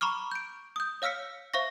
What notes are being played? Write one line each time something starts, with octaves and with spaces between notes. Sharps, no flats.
A#5 B5 C#6 D6 F6
G6 D7
D#6 G6
C#5 F5 E6 F6 B6 C#7
C5 E5 F5 C#6 A#6